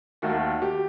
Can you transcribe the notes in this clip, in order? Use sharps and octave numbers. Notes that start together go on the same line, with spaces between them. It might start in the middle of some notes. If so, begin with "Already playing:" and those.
D#2 D#3 A3 F#4
G4